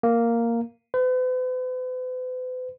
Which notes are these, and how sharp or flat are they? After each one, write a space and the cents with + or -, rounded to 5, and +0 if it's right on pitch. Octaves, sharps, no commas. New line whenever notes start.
A#3 -5
B4 +45